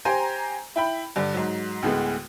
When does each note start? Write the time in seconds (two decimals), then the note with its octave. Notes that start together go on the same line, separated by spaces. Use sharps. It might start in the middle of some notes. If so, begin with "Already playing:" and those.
0.05 G4 C5 G5 G#5 A#5
0.76 E4 G5 B5
1.16 G2 D3
1.34 G#2 F#3
1.82 D2 A2 G#3 B3